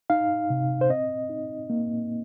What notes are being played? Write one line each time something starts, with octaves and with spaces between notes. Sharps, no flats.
D#4 F5
C3
C5
C4 D#5
D#4
A#3